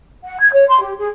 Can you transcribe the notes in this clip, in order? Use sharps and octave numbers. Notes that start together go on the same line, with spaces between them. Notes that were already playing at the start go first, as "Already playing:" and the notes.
F#5
G#6
C#5
C6
G4
G#4